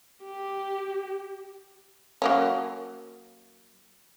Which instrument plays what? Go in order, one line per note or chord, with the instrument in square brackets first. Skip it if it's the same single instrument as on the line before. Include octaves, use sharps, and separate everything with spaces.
[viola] G4
[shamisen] F#3 A#3 C#4